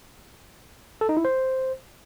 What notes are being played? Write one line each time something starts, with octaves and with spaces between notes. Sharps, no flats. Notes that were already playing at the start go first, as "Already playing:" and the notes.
A4
D#4
E4
C5